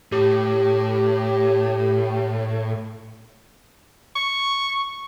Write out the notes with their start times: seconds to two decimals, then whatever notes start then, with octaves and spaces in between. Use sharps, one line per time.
0.12 A2 G4
4.16 C#6